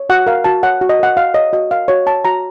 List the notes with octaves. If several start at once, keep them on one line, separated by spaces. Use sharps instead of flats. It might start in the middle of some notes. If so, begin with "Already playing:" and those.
Already playing: C#5
F#4 F#5
A#4 F5
F#4 A5
C#5 F#5
F#4
D#5
A#4 F#5
F#4 F5
C#5 D#5
F#4 D#5
A#4 F5
F#4 C#5
C#5 A5
F#4 A#5